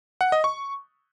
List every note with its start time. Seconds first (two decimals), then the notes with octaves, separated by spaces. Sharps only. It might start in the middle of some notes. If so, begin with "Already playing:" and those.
0.21 F#5
0.32 D#5
0.44 C#6